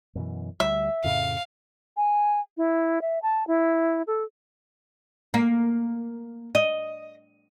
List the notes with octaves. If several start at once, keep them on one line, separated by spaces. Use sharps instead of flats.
F#2 B2 E3
D2 G3 E5
F2 A2 C#3 F5
G#5
E4
E5
A5
E4
A4
A#3
D#5